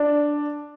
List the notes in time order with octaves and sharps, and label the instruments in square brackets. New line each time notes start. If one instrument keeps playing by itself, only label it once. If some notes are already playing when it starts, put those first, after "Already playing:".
Already playing: [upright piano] D4